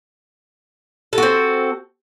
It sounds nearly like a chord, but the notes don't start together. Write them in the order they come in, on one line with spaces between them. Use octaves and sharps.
A4 F#4 C4